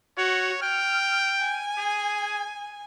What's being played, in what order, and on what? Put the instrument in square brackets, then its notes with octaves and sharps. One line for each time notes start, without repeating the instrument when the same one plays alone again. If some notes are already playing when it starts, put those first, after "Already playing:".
[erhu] F#4 [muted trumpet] C#5
[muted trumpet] G5 [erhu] F6
[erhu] G#5
[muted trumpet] G#4